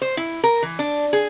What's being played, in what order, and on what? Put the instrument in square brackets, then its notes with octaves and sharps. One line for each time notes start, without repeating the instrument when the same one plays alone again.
[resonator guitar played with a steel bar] C5
E4
A#4
E3
D4
G#4